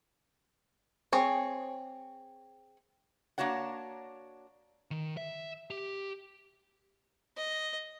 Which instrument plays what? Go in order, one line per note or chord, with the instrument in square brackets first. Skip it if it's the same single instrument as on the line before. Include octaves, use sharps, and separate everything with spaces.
[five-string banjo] C4 G#4 C#5
[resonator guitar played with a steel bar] A#3 D4 F#4 C#5 F#5
[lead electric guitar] D#3
E5
G4
[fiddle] D#5